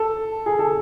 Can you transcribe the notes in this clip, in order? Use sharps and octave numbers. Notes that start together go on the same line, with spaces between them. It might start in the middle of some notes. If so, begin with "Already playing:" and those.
Already playing: A4
G#4
A4